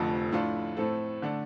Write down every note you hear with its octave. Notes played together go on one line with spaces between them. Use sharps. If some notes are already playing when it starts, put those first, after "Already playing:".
Already playing: F1 F2 D3 F3 A3
A2 A3 D4 F4
A2 A3 C4 A4
D3 A3 D4